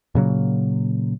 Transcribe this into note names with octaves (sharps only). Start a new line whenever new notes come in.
A#2 C#3 F#3 A#3